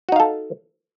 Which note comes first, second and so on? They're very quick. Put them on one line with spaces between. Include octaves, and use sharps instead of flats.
F#4 D#4 F5 A4